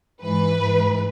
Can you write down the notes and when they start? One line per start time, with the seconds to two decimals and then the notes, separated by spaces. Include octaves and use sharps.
0.21 G#2 E3 B4
0.58 G#2 E3